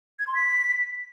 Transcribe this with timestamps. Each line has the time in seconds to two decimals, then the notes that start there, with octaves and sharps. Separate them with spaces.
0.19 G#6
0.27 C6
0.35 B6